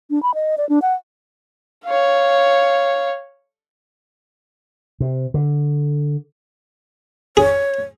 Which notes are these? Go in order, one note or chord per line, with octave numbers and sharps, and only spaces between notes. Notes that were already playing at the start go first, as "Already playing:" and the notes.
D4
B5
D#5
D5
D4
F#5
C#5 F5
C3
D3
G#4 C#5